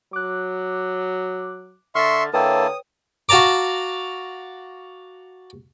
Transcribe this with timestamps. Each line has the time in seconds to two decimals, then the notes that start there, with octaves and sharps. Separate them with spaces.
0.13 F#3 D6 F#6
1.95 D3 E5 C6 C#6 F6 A6
2.33 D3 A#3 E4 B4 C#5 G5 A5 D#6
3.29 F#4 F5 A5 A#5 D6